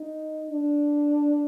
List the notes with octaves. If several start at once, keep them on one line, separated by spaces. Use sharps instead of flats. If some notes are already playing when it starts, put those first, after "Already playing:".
Already playing: D#4
D4